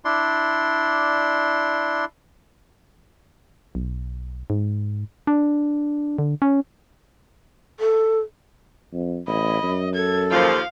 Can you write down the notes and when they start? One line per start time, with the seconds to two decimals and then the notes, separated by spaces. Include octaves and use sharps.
0.05 D4 E4 D5 C6
3.75 B1
4.50 G#2
5.27 D4
6.19 D3
6.42 C#4
7.80 A4
8.93 F2
9.27 A1 D#5 B5
9.63 F#2
9.95 A4 G#6
10.31 D#2 F3 F5